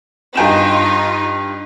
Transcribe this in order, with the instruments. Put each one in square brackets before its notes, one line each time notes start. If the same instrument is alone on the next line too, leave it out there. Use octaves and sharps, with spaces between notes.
[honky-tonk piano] G2 G5 E7 [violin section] D#4 F4